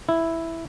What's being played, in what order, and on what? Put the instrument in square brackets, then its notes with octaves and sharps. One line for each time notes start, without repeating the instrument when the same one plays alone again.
[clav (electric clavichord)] E4